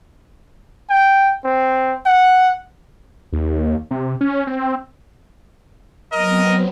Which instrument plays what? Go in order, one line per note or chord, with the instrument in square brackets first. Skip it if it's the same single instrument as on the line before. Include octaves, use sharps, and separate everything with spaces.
[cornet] G5
C4
F#5
[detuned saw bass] D#2
C3
C#4
C4
[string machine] F#3 B3 C4 [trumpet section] A#4 D#5